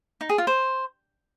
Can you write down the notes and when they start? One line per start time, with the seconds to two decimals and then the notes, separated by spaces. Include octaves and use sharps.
0.21 D#4
0.29 G#4
0.38 F4
0.47 C5